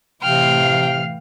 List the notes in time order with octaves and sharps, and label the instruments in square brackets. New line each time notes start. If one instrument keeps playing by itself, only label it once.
[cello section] A2 E3 F5 [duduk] C3 [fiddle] G5 [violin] F6